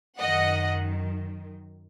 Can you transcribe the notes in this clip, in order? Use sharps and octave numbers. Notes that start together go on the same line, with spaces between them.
F#2 D#3 D#5 F#5